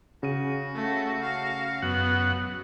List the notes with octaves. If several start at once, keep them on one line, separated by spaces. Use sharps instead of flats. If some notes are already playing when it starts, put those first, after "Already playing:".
C#3 F#4 D#7
A3
F5
F#2 B3 F#5